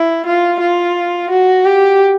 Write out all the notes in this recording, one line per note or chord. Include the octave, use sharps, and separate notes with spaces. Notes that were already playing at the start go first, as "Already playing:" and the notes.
Already playing: E4
F4
F4
F#4
G4